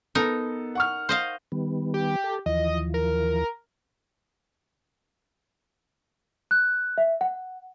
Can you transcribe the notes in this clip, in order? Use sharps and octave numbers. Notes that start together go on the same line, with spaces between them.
B3 D#4 A4 A#4
F#5 C#6 F6
C5 D#5 F5
D#3 G3 B3
G4
A4
D#2 E3 F3 D#5
A#4
F#6
E5
F#5